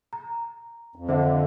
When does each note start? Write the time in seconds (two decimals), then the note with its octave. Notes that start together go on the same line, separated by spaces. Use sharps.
0.13 A#5
0.96 F2
1.09 D3 C5 E5 F#5